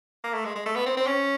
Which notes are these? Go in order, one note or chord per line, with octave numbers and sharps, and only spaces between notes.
A#3
A3
G#3
G#3
A3
B3
C4
C4
C#4